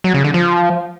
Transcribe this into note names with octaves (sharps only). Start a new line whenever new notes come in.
F#3
C#3
D3
F3